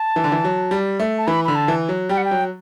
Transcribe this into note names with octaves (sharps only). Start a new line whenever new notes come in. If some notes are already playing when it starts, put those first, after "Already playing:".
Already playing: A5
E3
D3
E3
F#3
G3
A3
A5
E3 B5
D3 B5
A5
E3
F#3
G3 G5
F#5
G5
F#3